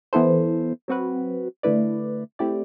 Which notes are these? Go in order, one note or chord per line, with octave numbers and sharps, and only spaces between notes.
E3 B3 E4 A4 C5
F#3 C4 F#4 B4
D3 A3 E4 B4 D5
A3 C4 E4 G4 D5